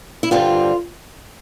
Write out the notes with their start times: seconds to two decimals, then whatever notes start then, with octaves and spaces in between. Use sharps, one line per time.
0.23 E4
0.31 G2 D3 G3 C4 F4